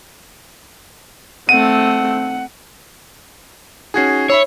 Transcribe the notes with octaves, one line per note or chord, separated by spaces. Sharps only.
A3 C4 F#5 D#7
C#4 D#4 F#4 G#4 G#6 C7
C#5 E5 B5 E6